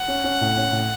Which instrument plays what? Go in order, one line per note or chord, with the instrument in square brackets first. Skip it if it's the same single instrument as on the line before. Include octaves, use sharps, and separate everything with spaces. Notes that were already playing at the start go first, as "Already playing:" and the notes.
Already playing: [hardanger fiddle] F#5
[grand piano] C#4
C#4
A2
C#4
A2